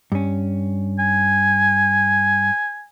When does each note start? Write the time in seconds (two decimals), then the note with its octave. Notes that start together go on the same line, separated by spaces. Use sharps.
0.12 G2 C#4
0.99 G#5